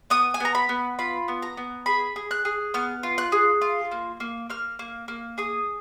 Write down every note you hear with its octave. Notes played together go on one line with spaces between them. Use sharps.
B3 D#6
G#5
B3 A#5
B5
B3
F4 B5
B3
A#5
B3
G#4 B5
G#4
F#6
G#4
B3 F6
F4
F#6
G#4
F4
A#3
A#3
A#3 F6
A#3
A#3
G#4 D#6